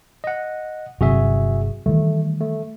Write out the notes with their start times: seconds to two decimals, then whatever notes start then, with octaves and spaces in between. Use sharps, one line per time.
0.24 D#5 F#5
1.01 G1 C3 F#3 F#4 G#4 E5
1.86 D#3 E3 G3 A3
2.40 A3